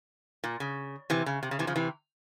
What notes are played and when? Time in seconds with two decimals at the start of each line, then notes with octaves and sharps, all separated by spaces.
0.44 A#2
0.60 C#3
1.10 C3 E3
1.26 C#3
1.43 C3
1.51 C#3
1.59 C3 E3
1.67 C#3 F3
1.75 C3 E3